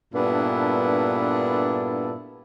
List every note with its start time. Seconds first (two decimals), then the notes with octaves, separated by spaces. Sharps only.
0.14 G2 A#2 B3 D4 E4 A4